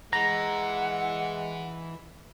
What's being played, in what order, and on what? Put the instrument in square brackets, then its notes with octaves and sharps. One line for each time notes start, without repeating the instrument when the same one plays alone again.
[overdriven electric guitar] E3 [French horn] G#3 [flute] F#5 [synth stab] A#5